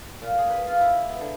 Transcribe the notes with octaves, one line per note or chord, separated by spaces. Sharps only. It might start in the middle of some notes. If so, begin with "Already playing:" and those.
A#2
G#4
B4
F4
E4
B3
D3